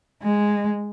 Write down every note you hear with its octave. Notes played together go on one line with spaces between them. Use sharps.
G#3